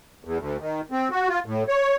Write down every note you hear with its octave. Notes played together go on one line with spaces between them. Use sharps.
E2
D2
D#3
C4
F#4
F4
A2
C#5